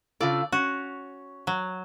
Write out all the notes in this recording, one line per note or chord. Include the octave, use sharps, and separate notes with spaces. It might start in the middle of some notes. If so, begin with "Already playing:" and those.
C#3 F4 A4 D5
C#4 F#4
F#3